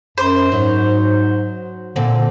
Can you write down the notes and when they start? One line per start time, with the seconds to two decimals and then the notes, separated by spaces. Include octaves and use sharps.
0.18 F#2 C5
0.52 G#2 F#3
1.96 A#2 D3 C4 A4